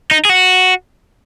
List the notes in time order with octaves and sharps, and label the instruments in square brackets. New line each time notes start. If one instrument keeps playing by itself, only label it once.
[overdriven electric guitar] D#4
G#4
F#4